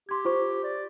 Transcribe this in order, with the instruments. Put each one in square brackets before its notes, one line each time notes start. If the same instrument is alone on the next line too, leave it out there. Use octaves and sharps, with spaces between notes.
[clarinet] G4 [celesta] C6 G#6
[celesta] F4 C5 C#6
[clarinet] D5